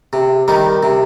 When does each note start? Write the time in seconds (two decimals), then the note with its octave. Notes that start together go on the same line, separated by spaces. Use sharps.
0.13 C3
0.48 D#3 G3 D#4
0.83 C3